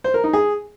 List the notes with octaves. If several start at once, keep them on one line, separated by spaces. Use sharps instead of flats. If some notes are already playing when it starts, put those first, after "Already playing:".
C5
A#4
D#4
G#4